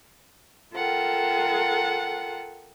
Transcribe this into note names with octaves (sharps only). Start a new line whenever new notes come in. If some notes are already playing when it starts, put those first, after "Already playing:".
F4 A4 A#4 F#5 G5